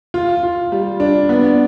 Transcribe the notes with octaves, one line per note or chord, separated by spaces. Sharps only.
F4
F4
G3
D4
B3